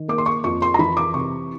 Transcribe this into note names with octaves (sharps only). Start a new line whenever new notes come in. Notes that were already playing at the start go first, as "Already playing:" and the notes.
Already playing: D#3
A#3 D6
C6
C#6
F2 C#6
C6
A#5
E3 B5
D6
C3 C#6